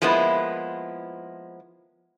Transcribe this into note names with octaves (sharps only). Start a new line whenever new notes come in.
F3 G#3 A#3 B3 E4